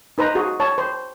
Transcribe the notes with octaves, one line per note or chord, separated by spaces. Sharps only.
D#4 B4 C5 A#5
F#4 G#4
C#5 A5
C5